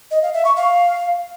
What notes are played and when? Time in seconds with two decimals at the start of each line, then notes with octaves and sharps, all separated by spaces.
0.11 D#5
0.22 F5
0.34 E5
0.45 C#6
0.56 F5